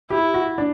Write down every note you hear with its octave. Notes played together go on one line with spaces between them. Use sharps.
E4 G4
F#4
D4